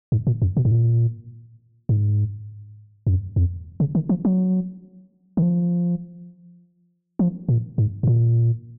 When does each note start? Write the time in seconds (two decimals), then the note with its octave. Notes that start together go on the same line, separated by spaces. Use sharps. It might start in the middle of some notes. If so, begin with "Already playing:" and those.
0.12 G#2
0.27 A#2
0.42 F#2
0.57 B2
0.65 G#2
0.71 A#2
1.89 G#2
3.07 F#2
3.36 F2
3.80 C#3
3.95 D#3
4.09 F3
4.25 F#3
5.37 D#3
5.42 F3
7.19 F3
7.49 A#2
7.78 G#2
8.03 G#2
8.07 A#2